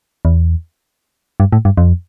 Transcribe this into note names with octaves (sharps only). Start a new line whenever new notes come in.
E2
G2
A2
G2
F2